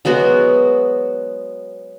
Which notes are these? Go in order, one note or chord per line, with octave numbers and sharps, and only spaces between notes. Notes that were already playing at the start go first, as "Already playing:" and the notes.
F#3 G#3 B3 F#4